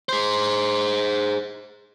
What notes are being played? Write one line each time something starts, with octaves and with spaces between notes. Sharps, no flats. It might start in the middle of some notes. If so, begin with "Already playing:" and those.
G#4 C5